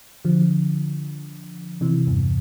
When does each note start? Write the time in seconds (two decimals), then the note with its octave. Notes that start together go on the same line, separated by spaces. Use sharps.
0.25 D3 F3
1.81 C3 E3
2.07 E2 G2